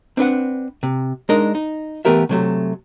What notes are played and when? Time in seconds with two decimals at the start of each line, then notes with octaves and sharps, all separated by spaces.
0.17 C4 D4 B4 F#5
0.83 C3
1.29 G#3 D4 D#4 A#4 D#5
1.55 D#4
2.05 E3 A3 B3 G4 A#4 E5
2.29 C3 F#3 A3